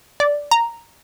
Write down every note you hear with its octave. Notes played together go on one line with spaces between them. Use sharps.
D5
A#5